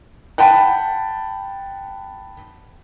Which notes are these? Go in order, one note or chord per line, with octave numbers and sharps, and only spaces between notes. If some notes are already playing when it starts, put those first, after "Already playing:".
F#5 G5 A5 B5